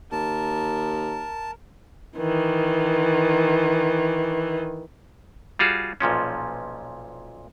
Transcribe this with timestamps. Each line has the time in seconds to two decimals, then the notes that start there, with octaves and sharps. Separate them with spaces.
0.12 D#2 A#4 A5
2.18 D#3 E3
5.59 G3 F4 F#4 G#4
6.00 B1 A#2 F3 C#4